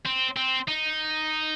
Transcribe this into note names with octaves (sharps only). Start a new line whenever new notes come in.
C4
C4
D#4